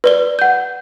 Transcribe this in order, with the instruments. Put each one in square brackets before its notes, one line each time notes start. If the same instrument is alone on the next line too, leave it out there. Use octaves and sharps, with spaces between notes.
[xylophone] B4 D5 G7
F#5 G6